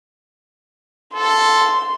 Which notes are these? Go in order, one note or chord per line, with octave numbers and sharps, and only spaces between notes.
A4 C6